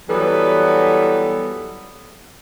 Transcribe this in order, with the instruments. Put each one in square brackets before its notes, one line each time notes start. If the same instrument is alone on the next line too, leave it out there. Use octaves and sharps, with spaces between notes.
[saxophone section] E3 F#3 G3 B3 A4 B4